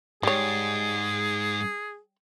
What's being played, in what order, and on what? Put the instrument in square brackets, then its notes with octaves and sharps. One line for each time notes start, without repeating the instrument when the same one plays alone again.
[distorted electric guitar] G#2 [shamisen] G3 C#5 [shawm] G#4